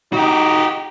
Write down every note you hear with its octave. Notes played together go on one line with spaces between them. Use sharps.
D#4 F#4 G4